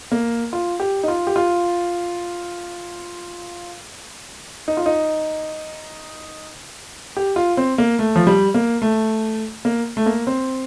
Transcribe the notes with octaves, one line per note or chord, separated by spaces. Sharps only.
A#3
F4
G4
D#4
F4
G4
F4
D#4
F4
D#4
G4
F4
C4
A#3
A3
F3
G3
A#3
A3
A#3
A3
A#3
C4